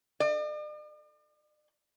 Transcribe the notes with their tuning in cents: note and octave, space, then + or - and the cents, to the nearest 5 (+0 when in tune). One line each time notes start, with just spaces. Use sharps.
D5 +45